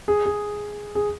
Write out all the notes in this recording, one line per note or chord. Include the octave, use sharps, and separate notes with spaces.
G#4
G#4
G#4